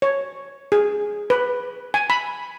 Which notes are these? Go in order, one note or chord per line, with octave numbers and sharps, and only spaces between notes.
C#5
G#4
B4
G#5
B5